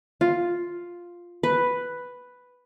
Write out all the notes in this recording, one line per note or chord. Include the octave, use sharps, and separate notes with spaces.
F4
B4